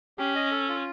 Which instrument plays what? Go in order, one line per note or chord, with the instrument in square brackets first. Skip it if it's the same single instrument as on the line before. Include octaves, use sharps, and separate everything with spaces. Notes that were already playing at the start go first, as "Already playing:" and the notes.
[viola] C#4 [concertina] G4
[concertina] D#5
A4
F4